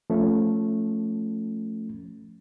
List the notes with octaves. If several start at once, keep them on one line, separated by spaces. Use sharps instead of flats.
F3 A3 C#4